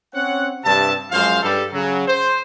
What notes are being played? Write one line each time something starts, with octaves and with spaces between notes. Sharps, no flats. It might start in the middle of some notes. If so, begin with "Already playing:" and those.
C4 C#4 C#5 F#5
G2 C3 D4 E5 A5
F#2 F3 G#3 C5 F5
G2 G3 A4
C#3 F#3
C5